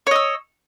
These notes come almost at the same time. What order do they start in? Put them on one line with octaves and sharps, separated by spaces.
C#5 D#5 E6